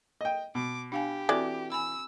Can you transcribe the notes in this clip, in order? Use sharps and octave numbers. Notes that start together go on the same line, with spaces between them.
D#5 G5
B2 D6
D4 G4 F5 G#5
E3 C4 F#4 A4 D5
G#5 B5 E6